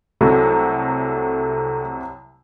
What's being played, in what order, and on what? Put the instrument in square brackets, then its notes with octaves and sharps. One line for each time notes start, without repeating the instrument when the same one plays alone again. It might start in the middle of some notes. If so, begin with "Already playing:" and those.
[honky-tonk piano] C2 C3 F#3 [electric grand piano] A3